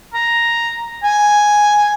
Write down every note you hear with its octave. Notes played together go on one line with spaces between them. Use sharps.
A#5
G#5